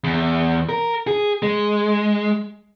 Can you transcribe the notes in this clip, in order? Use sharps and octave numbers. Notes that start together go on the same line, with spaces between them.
E2
A#4
G#4
G#3